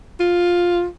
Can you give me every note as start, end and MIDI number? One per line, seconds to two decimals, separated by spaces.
0.20 0.86 65